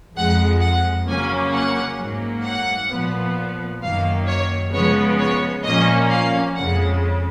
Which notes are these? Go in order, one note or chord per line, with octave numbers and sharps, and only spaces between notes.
F2 F3 G#3 F#5
F#5
C#3 F#3 A#3 C#4 G#5
F#5
G#2 F#3 A#3
F#5
A#2 F3 B3
F#2 D#3 F#3 A#3 F5
C#5
C#3 F3 G#3 B3 C#5
C#5
A#2 F3 A#3 C#4 D#5
F5
F2 C#3 G#3 F#5